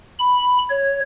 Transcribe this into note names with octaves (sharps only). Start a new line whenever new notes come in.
B5
C#5